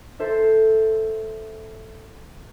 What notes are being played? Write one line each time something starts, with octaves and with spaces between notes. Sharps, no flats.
A4 C5 E5